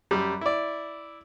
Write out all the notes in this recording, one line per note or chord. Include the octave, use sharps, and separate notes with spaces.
F#2 G3
E4 D5